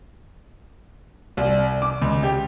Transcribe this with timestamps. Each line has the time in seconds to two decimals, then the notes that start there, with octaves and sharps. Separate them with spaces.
1.37 C2
1.82 D6
2.02 C#2
2.23 G4